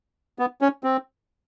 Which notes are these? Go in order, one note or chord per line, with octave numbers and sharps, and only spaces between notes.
B3
C#4
C4